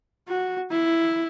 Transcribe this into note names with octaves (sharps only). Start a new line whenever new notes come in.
F#4
E4